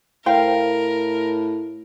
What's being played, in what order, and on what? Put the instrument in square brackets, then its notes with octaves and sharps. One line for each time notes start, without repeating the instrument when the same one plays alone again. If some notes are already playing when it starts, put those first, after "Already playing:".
[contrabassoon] A2 [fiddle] A#4 [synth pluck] C5 G5 [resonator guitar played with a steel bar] F5